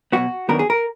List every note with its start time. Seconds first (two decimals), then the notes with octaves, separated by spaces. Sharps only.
0.12 B2 F#3 B3 F#4
0.49 F#2 D#3 F#3 B3 D4 A#4
0.59 G#4
0.70 A#4